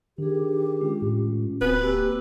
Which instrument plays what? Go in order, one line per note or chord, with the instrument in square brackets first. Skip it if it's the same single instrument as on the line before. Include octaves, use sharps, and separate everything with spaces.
[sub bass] D#3 [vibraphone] D4 G#4 [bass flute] G4
[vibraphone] G#3 C#4 F4
[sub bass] A2
[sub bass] D1 [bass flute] C4 [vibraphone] F#4 G5 G#5 [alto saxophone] B4
[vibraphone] A#3 E6 [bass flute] G4